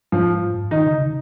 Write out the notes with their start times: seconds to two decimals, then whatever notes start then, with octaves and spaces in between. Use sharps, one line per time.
0.12 G#2 F3
0.71 D#3 D#4
0.86 C#3
1.01 C#3